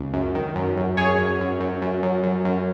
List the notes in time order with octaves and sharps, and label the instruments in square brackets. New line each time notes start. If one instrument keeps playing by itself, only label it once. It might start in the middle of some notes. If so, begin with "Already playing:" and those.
Already playing: [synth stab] C#2
F#2
D#3
F#2
F#2
F#2 G#4 C#5
F#2
F#2
F#2
F#2
F#2
F#2
F#2